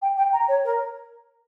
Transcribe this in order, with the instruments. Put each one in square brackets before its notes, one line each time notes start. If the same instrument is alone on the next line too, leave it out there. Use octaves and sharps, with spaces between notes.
[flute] G5
G5
A#5
C#5
A#4